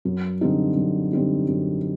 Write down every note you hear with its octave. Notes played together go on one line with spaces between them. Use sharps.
F#2
D3 G3 C4 D#4
F#2
D3 G3 C4 D#4
F#2